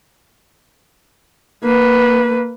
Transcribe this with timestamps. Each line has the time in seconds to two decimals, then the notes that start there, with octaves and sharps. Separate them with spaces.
1.63 A#3 B4